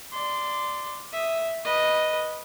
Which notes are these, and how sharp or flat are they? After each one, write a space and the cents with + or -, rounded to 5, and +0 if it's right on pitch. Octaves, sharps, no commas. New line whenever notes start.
D5 +5 C6 -15
E5 +0 D#6 +0
B4 -15 D#5 +0